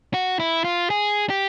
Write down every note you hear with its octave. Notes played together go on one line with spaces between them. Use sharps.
F#4
E4
F4
G#4
G4